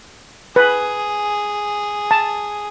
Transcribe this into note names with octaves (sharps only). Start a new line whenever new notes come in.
G#4 B4
A5